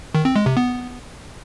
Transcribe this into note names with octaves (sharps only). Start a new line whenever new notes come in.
D#3
C4
G#3
C3
B3